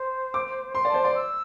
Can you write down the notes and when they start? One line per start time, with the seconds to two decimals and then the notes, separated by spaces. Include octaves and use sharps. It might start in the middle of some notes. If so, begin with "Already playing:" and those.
Already playing: C5
0.34 D6
0.75 C6
0.85 D5
0.88 A5
0.94 C5
1.01 D5 C6
1.15 E6